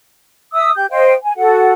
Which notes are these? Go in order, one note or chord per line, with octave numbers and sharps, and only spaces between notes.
E5 D#6 E6
G4 G6
C5 D#5 F5 G5
G#5
F#4 A4 F#5